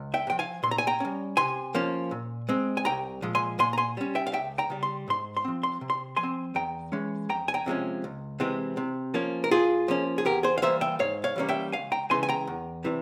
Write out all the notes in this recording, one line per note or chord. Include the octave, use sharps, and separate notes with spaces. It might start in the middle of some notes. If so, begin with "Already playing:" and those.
Already playing: C#2
E5 G5
C3
F3 G5
F5 G#5
A#2 C6
A#5
G#5
G5 A#5
G3 C#4
C3 G#5 C6
F3 A#3 C#4
A#2
G#3 C4
G#5
C2 G5 A#5
A#2 F3 G#3
G#5 C6
A#2 G#5 C6
A#5
G#5 C6
G3 C#4
E5 G5
F5
C#2 E5 G5
G5 A#5
C#3 G3
C6
G#2 C6
C6
F3 C4
C6
C3
C6
F3 G#5 C6
C4
E2 G5 A#5
E3 G#3 C#4
F2 G5 A#5
G#5
G5 A#5
C3 F3 G#3 C#4
C#2
C3 E3 G#3 C4
C3
F3 A#3 C#4
A#4
G2 F4 G#4
F3 A#3 C#4
G#4
E2 G4 A#4
G#4 C5
F5
E3 G3 A#3 C5 E5
E5 G5
G#2 C#5 F5
C#5 F5
E3 G3 A#3 C#4
E5 G5
C#2 F5 G#5
G5 A#5
C#3 E3 G#3 G#5 C6
G#5
G5 A#5
E2
C3 E3 G3